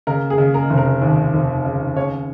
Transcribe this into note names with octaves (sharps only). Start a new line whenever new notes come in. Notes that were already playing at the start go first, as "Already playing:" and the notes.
C#3 A#4
G#4
C#3
A#4
F1
A#4
D#2
F1
C#3
C#3 C#5